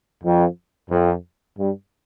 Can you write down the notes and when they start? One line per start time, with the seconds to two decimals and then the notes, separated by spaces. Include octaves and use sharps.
0.23 F2
0.90 F2
1.59 G2